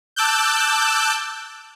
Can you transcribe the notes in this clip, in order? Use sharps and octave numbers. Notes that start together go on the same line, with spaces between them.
A5 D6 E6 F#6 G6